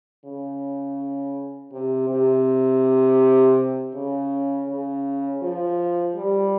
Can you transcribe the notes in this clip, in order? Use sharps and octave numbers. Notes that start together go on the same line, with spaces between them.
C#3
C3
C3
C#3
C#3
F3
G3